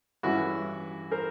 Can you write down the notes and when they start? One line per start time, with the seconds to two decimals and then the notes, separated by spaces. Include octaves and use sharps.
0.23 G2 E3 G#3 C#4 E4 F#4
1.11 A#4 C5